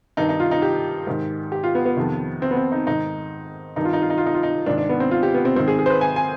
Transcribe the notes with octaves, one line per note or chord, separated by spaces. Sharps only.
G2 D#3 D#4
D#4
F4
D#4
G4
G#2 D#3
G4
F4
B3
B3
F2 C3 D#3
C4
B3
C4
D#4
G#2 D#3 D#4
G2 D#3 D#4
F4
D#4
F4
D#4
F4
D#4
F4
D#4
G#2 D#3 D4
D4
B3
C4
F4
G4
B3
C4
G#2 D#3 C4
G#4
G#4
C5
B4
G#5
G#5